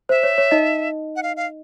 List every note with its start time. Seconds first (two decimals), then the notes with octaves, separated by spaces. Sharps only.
0.09 C5 E5
0.23 C#5
0.38 C#5
0.51 D#4 D#5
1.16 F#5
1.23 F5
1.37 F5